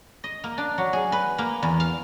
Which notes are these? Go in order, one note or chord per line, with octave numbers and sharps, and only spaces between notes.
D#5
A#3
D4
F#3
G#4
B4
A#3
E2
F5